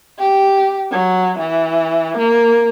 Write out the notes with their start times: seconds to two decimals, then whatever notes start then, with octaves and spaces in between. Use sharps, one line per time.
0.19 G4
0.91 F#3
1.39 E3
2.18 A#3